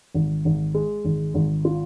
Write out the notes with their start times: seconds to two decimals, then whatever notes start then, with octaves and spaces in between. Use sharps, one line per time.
0.14 G#1
0.45 G#1
0.74 G#3
1.05 G#1
1.34 G#1
1.65 F4